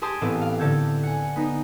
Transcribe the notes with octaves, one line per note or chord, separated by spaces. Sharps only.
G4 G#4 C5 A5 C6 D#6
A1 A2 B3 C4 D6
F5
A2 D3 A4 G6 G#6
F#5 G#5
B3 D#4